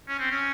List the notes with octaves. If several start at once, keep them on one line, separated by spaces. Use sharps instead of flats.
C#4
C4
C#4